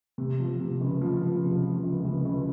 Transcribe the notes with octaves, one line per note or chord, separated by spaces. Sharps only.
C3
F3
C3
C#2
F3
F3
C3
F3
C#2
C#2
C#2